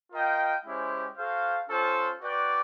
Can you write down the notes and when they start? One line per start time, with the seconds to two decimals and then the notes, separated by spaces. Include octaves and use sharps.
0.12 F4 A#4 D#5 G5
0.65 G#3 C#4 E4 G4 C5
1.17 F#4 A4 C5 F5
1.68 C#4 F4 A4 C5
2.21 F#4 B4 D5 G5